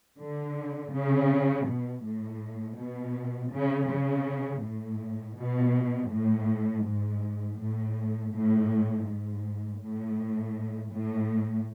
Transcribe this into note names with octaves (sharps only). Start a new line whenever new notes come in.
D3
C#3
B2
A2
B2
C#3
C#3
A2
B2
A2
G#2
A2
A2
G#2
A2
A2